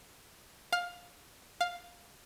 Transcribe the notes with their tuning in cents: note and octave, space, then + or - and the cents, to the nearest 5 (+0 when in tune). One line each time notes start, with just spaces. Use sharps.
F5 +15
F5 +5